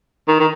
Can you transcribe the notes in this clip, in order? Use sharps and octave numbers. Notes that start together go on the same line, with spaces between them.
D#3
D#3